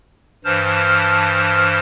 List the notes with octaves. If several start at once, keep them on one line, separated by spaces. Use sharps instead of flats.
G2 E3 C5 A5 F6